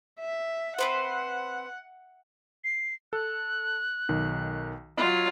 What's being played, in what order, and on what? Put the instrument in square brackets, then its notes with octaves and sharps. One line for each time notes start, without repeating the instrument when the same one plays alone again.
[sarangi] E5
[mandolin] C4 B4 C5 [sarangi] F#5
[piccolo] C7
[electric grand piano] A4 [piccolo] F#6
[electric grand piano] B1 D#3
[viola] F#3 F4 [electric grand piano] D#5